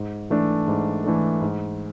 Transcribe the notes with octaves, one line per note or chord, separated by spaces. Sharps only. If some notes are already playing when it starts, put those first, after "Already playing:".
Already playing: G#2
E3 A3 D4 A4
G#2
E3 A3 D4 A4
G#2